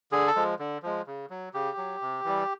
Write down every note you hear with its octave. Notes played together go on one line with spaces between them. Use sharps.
D3 G#4
A4
F3 G#3
D3
F3 G#3
C#3
F#3
C#3 G4
F#3
C3
E3 G3